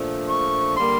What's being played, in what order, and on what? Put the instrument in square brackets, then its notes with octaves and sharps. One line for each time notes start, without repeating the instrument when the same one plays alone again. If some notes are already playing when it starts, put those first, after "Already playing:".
Already playing: [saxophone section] A#2 F3 A3 D4
[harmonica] C#6
[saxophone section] D3 G3 A#3 [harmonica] C6